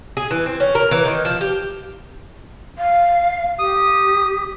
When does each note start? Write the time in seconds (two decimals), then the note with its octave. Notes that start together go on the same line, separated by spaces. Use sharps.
0.17 G#4
0.31 E3
0.46 C4
0.60 C#4
0.75 A#4
0.91 E3
1.05 D#3
1.25 F3
1.41 G4
2.78 F5
3.59 G4 D#6